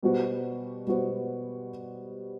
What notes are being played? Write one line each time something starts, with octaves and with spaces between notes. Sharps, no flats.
B2 G3 B3 F#4 C5
B2 G3 B3 F#4 C5